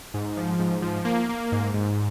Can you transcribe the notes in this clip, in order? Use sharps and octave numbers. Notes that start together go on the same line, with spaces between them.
G#2
F3
G#2
F3
A#3
A#3
G#2
G#2